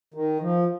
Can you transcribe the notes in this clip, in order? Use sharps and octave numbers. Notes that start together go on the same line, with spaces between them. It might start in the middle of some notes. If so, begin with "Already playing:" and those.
D#3
F3